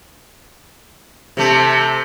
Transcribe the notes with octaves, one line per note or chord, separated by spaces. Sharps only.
C3 A3